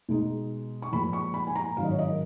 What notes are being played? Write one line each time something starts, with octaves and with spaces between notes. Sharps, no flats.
B2 G#3 D#4
C#6
A#2 F3 G#3 B5
C#6
B5
G#5
A#5
G#2 D#3 F#3 C#4 F5
D#5
C#5
D#5
A#4